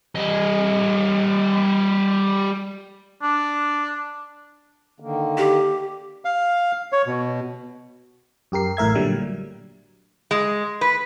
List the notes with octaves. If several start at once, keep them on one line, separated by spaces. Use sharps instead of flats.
G3 D#5
D4
D3 D#3 A#3
G4
F5
C#5
B2
F#2 G4 A#4 C7
A1 A2 A#4 E5 G#6
A#2 D3 F#3 G3
G#3
B4